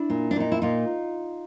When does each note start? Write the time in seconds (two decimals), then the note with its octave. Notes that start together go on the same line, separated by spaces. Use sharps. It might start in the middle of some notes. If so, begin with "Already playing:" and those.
Already playing: D4 E4
0.10 A#2
0.31 D4
0.36 A#2 D#4
0.52 E4
0.62 A#2 D#4 F4